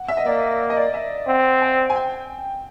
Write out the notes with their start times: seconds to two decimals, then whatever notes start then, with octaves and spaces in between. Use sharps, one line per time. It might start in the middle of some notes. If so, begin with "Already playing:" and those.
Already playing: F#5
0.08 E5
0.17 D#5
0.25 A#3 D5
0.70 D#5
0.77 D5
0.94 E5
1.27 C4 F#5
1.61 G#5
1.90 G#5
1.96 G5